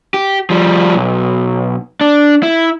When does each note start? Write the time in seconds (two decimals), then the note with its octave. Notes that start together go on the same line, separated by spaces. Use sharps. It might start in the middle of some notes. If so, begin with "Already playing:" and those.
0.14 G4
0.50 F3 G3
0.95 B1
2.01 D4
2.43 E4